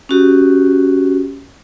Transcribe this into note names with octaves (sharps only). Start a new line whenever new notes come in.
C#4 F#4 G4